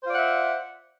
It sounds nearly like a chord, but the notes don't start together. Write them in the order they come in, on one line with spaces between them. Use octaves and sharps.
C5 F4 D5 F#5 E5